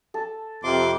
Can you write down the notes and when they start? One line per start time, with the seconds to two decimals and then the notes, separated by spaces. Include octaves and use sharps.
0.14 A4
0.64 F2 C3 C6 D6